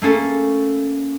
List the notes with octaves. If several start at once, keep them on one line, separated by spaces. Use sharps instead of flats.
A3 A#3 C#4 A4